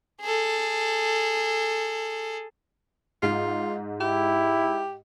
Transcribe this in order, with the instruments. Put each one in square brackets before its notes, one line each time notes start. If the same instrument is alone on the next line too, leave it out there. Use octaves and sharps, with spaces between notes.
[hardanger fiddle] G#4 A4
[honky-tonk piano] G#2 [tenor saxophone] F4
[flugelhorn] E4 [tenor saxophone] G4